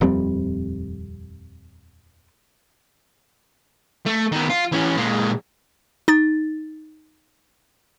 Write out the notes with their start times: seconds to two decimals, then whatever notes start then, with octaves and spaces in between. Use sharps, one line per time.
0.01 D#1 F2 G3 C4
4.06 A3
4.32 D#3 B3
4.50 F4
4.72 E3 C#4
4.97 A#2 G#3
6.08 D#4 A6